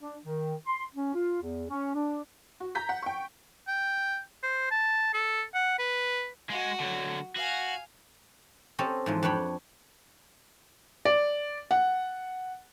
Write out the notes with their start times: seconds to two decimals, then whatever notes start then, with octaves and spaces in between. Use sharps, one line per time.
0.02 D4
0.25 D#3
0.67 C6
0.95 C#4
1.15 F4
1.42 E2
1.70 C#4
1.95 D4
2.60 F#4
2.75 A#5 G6 B6
2.89 F#5
3.02 G5 C#6
3.67 G5
4.43 C5
4.71 A5
5.14 A4
5.54 F#5
5.78 B4
6.50 G#3 F#4
6.80 D3 F#3
7.36 F#4 F5 G#5
8.79 C4 C#4 G4 A4 D#5
9.06 G#2 E3 F3
9.23 F2 D4 B4 C#5 G5 B5
11.05 D5
11.71 F#5